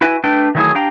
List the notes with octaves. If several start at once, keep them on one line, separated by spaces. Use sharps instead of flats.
E4 F#4 B4 E5 G#5
A3 D4 B4 G5
D#3 E3 F#3 A3 E4 G#4
D4 G4 F5 G5 A#5